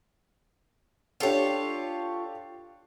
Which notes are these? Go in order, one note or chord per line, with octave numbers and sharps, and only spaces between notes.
D4 F4 G4 A4 C#5